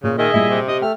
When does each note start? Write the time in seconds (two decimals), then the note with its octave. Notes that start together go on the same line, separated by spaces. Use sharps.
0.04 A#2 C#3
0.18 D#3 G#4 D#5 E5
0.34 A#2 G3 E4
0.50 C3
0.68 G4 D#5 D#6
0.82 A3 G5 F6